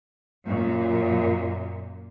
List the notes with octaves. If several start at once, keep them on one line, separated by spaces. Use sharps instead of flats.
F#2 A#2